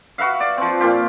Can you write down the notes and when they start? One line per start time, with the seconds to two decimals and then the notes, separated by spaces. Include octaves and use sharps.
0.18 F#4 B4 E5 F5
0.40 D5
0.58 F3 C4
0.80 A#2 F4 G4